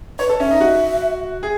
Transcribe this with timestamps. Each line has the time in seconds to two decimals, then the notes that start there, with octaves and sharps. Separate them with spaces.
0.19 B4 C#5
0.29 A4
0.40 C#4 E5
0.51 D#4
0.61 F#4
1.43 G#4